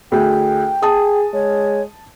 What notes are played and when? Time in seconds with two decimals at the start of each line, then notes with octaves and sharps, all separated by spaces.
0.12 D2 G#4 G5
0.83 G#4 A5 D#6
1.33 G#3 C#5